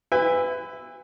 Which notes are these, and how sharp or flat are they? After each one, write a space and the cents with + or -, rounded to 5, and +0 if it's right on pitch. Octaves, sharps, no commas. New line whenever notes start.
B4 +25 E5 +0 G#5 -35